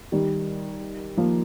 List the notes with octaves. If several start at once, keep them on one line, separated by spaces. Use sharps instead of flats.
D#3 G3
F3 A#3